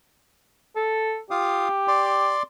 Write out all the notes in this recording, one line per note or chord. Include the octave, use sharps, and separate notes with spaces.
A4
F4 G4 F5 D#6
D5 C6 D6